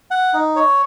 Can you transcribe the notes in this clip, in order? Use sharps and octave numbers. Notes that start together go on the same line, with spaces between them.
F#5
D#4
C#5